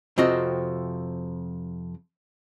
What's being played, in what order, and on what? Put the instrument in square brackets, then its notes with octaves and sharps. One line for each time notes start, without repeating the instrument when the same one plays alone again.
[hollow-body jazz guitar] F2 C3 C4 F4 F#4 D#5